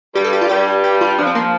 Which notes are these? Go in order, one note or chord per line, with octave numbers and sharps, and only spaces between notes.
G2 G3 G4
A4
G4
F4
G2 G3 G4
G4
F4
F3 D4
C4
A#3